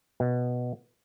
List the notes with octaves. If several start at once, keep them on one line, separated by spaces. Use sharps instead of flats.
B2